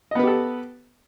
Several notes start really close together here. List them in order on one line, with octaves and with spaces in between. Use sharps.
D#5 B3 B4 G4 A4